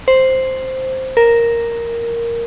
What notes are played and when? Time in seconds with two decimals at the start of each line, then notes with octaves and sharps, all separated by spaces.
0.08 C5
1.17 A#4